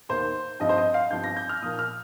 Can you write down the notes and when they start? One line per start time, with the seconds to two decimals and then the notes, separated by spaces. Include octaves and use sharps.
0.09 D#2 D#3 A#3 C5
0.60 G2 F3 C4 D#5
0.69 C5
0.78 D#5
0.94 F5
1.10 G2 F3 C4 G6
1.24 A#6
1.36 G6
1.49 F6
1.62 A#2 F3 A#3 D#6
1.79 F6